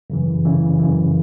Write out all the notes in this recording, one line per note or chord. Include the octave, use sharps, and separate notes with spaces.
F#2 C#3 E3
F#2 C#3 E3
F#2 C#3 E3